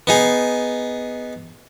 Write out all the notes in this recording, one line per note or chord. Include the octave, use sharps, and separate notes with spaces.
B3 D#4 G#4